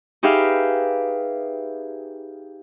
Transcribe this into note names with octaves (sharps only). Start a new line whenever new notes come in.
D#4 G4 G#4 B4 E5 F5